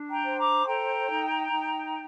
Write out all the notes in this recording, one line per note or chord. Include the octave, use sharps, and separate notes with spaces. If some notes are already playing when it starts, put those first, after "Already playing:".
Already playing: D4
G5 A#5
C5
A#5 D6
A4 G5 A#5
D#4
D#4